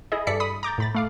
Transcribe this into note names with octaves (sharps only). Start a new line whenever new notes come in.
E4 G#4 D#5
G2 A4 D5 E5 B6 C#7
B5 D#6 B6
A#5 D6 G6 A6
A2 B5 A6
A3 F5 D6